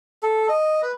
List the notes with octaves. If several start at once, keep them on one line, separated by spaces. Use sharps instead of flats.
A4
D#5
B4